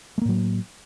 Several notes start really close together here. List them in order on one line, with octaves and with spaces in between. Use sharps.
A3 A#3 A2 F#3